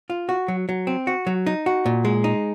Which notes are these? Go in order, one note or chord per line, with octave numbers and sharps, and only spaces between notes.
F4
F#4
F#3
F#3
C4
F#4
F#3
D#4
F#4
A#2
G#3
D#4